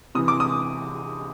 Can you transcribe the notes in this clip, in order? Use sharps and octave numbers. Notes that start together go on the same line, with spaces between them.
C3 E3 D#6
D6
D#6